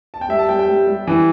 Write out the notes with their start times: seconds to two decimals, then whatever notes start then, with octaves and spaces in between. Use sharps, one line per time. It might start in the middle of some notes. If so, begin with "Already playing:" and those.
0.14 A5
0.21 G5
0.29 G3 E5
0.39 A5
0.49 G3 G5
0.59 G5
0.69 G3
0.87 G3
1.07 E3